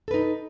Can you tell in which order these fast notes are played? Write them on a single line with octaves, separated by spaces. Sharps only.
A4 B4 D#4